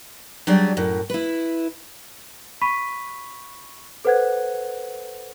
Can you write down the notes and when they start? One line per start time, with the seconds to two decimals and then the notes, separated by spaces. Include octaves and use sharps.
0.47 F#3 G3 D4 G4 G#4 D5
0.77 F#2 A2
1.10 E4 B4
2.61 B5 C#6 B6 D#7
4.05 A4 B4 C5 F#5 F#6 G#6